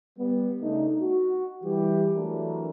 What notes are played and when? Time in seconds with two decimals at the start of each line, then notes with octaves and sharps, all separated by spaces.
0.19 G3 B3
0.62 C#3 A3 D4 D#4
1.01 F#4
1.64 E3 G3 G4
2.15 E3 F#3 A3 D4 F#4 A#4